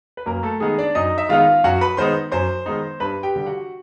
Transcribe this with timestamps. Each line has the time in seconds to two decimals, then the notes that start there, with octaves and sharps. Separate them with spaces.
0.17 B4
0.26 F#2 A#3 A#4
0.43 A3 A4
0.60 D#3 G#3 B3 D#4 G#4
0.78 D4 D5
0.95 F#2 D#4 D#5
1.18 E5
1.29 D#3 G#3 B3 D#4 F4 F5
1.64 F#2 F#4 F#5
1.81 B4 B5
1.97 D#3 G#3 B3 D#4 C5 C6
2.32 F#2 C5 C6
2.66 D#3 G#3 B3 D#4
3.00 G2 B4 B5
3.23 G4 G5
3.36 D3 G3
3.47 F#4 F#5